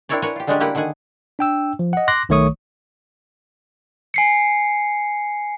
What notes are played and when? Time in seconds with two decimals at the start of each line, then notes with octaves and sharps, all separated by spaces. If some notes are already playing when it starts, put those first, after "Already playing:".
0.09 C4 D4 E4 A#4 C#5 D5
0.22 A#4 B4 C#5 F#5 G#5
0.36 F4 G4
0.47 D3 G3 G#3 C#4 D4 G4
0.60 A#3 E4 G4 B4 F#5 G5
0.75 D3 D#3 G#4 F#5 G#5
1.39 D4 G5 E6
1.79 F3
1.93 D#5 F#5
2.08 C6 D6 F#6 A#6
2.29 B1 D#3 A3 C#5 C#6 D#6
4.14 G#5 C7 C#7